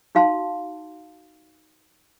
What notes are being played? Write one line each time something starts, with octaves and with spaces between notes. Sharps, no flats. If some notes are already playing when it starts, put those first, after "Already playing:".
D#4 F#4 F5 A5 C6